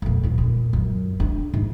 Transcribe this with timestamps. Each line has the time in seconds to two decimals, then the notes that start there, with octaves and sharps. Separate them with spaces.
0.02 F2 A#2
0.23 D#2 G#2
0.38 A#2
0.73 F#2
1.20 D4
1.54 G#2